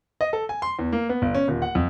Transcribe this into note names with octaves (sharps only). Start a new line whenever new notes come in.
D#5
A4
G#5
C6
E2
A#3
B3
G1
C#4
D#1
F#5
F2